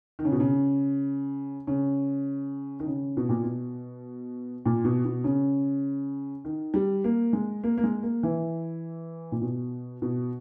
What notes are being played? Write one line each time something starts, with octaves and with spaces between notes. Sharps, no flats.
D#3
C#3
B2
C#3
C#3
D#3
C#3
B2
A#2
B2
A#2
B2
B2
C#3
D#3
G3
A#3
G#3
A#3
A#3
G#3
A#3
E3
A#2
B2
B2